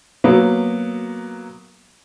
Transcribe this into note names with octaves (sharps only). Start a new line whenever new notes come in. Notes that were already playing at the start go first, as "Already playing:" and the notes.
F#3 A#3 B3